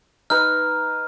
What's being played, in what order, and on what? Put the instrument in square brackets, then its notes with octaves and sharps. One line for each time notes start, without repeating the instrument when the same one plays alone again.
[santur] D#4 B4 [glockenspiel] F6